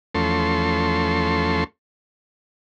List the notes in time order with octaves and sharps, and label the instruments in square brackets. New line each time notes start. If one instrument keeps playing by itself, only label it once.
[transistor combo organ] E2 F3 A3 C#4 A4 C6